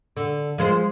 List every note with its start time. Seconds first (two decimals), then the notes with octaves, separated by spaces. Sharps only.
0.17 D3
0.58 F3 G#3 C5